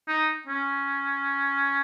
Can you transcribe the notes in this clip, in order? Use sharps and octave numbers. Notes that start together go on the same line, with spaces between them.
D#4
C#4